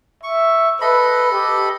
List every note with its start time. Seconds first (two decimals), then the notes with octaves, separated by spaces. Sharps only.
0.23 E5 C#6
0.81 A4 B4 D#5 B5
1.32 G4